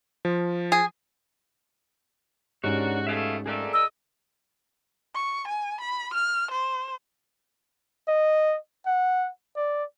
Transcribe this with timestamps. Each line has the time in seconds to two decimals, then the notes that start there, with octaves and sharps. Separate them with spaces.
0.25 F3
0.72 G#4
2.64 G#2 C#4 D4 F#4 G4 A#4 C#5
3.07 B2 A3 E5 F5 G#5
3.46 F2 A3 G#4 A#4 D5
3.73 D#5 E6
5.15 C#6
5.47 G#5
5.81 B5
6.14 F6
6.51 C5
8.08 D#5
8.87 F#5
9.57 D5